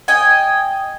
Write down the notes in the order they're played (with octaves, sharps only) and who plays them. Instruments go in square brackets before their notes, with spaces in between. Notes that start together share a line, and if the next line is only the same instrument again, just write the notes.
[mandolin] D#5 G5 G#5